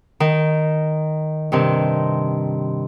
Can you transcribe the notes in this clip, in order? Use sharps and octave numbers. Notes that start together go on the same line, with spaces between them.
D#3
G2 C3 D#3